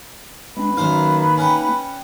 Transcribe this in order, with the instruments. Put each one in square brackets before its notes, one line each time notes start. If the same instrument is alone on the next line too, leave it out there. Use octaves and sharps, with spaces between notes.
[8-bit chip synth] G#3 C4 D4 [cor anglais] B4
[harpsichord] F#2 C5 F5 [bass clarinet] D#3 [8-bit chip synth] A#3 D#4
[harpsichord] C#4 F#5 G5